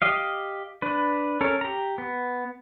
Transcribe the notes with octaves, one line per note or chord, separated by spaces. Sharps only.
G4 D#5 F5
D4 B4
C#4 A4 A#4
G4 A#5
B3